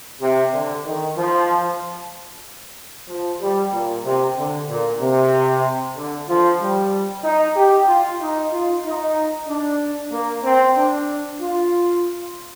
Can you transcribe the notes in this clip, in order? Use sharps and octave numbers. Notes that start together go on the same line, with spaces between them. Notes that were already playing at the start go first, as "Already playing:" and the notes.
C3
D3
D#3
F3
F3
G3
A#2
C3
D3
A#2
C3
D3
F3
G3
D#4
G4
F4
D#4
F4
D#4
D4
A#3
C4
D4
F4